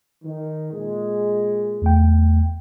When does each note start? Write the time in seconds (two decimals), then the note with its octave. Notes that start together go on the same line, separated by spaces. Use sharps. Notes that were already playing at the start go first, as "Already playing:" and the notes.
0.24 D#3
0.73 A#2 G#3
1.82 E2 A3 G5